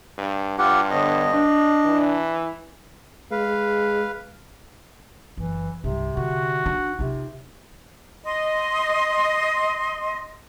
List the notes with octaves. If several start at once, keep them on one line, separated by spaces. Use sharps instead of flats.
G2
G2 F4 G4 F#5
D3 B3 C#5 D#5
D4
E3
G#3 B4 F5
F#1 E3
C2 G2 C3
D3 F#4
D4
C3 D#4 F4
D#5 C6